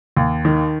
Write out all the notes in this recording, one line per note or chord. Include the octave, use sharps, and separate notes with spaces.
D#2
D#3